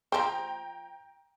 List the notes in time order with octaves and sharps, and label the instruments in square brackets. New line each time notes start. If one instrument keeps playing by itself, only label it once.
[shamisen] F3 A4 C5 [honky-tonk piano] G5 A#5